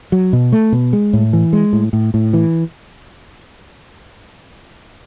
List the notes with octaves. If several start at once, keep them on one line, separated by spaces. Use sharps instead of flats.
F#3
B2
A3
B2
G#3
A2
E3
G#3
A2
A2
A2
E3